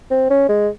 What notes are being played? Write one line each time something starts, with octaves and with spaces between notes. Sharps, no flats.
C4
C#4
G#3